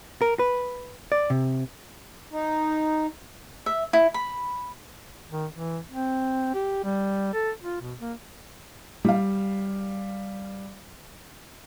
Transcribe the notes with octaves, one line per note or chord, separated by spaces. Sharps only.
A#4
B4
D5
C3
D#4
E5
E4
B5
D#3
E3
C4
G4
G3
A4
F4
B2
A#3
G3 F5